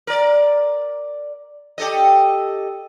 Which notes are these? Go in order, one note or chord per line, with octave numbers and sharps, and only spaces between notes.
A#4 D5
G4 A4 D#5